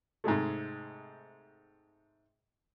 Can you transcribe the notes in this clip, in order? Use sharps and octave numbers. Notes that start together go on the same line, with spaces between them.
G#2 C3 G#3 A3